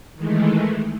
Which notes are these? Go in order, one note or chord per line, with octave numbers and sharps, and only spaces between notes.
D#3 E3 G#3 A3